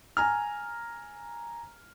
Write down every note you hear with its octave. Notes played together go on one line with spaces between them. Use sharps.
G#5 A#5 F6